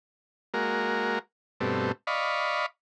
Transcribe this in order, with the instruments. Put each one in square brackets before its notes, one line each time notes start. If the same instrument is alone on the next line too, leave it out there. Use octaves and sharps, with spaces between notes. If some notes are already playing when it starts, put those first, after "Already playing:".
[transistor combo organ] G#3 A#3 F#4 A#4
G2 B2 A3 C4
D5 D#5 F5 B5 C#6